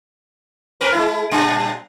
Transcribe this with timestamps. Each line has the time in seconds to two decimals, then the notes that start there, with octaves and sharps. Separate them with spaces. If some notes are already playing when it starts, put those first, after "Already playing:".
0.81 C4 A#4 B4
0.92 G#3 E4
1.31 A#2 G3 D4